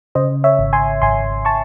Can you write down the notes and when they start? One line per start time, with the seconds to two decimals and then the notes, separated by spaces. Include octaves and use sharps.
0.15 C#3 C5 D#5
0.44 C#5 E5
0.59 G#1
0.73 G#5 C6
1.02 G#1 G#5 C6
1.45 A5 C#6